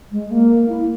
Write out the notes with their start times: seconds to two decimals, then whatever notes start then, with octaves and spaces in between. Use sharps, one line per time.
0.11 G#3
0.30 A#3
0.68 E4